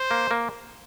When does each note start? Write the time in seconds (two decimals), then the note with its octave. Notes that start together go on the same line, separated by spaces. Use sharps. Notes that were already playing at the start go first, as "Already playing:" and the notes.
Already playing: C5
0.11 A#3
0.31 A#3